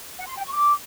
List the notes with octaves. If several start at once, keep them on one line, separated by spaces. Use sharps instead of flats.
F#5
C6
G5
C#6
D6